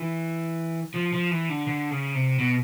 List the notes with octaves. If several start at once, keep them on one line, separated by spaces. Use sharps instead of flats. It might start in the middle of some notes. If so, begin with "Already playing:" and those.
Already playing: E3
F3
F3
E3
D3
D3
C#3
C3
B2